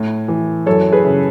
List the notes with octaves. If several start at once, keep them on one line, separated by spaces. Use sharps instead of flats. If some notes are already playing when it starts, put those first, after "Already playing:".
Already playing: A2
E3
F#2 A4 C#5
G#4 B4
C#3